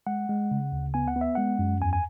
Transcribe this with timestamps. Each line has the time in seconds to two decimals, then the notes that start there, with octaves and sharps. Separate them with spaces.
0.07 G#3 F#5
0.29 G#3
0.51 C#3
0.72 D2
0.94 B3 G#5
1.08 F#5
1.16 B3
1.21 E5
1.35 G#3 F#5
1.59 F#2
1.81 E2 G#5
1.93 G#5